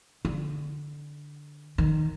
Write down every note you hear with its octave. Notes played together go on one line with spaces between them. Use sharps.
D3
D#3